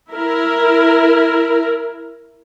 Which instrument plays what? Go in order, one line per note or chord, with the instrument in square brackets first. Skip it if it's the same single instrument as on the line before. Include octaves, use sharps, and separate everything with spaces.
[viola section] E4 A#4